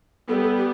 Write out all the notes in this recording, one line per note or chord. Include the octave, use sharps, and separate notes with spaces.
G3 B3 A4
A4
G4